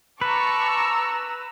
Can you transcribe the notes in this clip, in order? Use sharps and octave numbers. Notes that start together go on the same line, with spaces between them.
B4 A5 A#5 C#6 D6 E6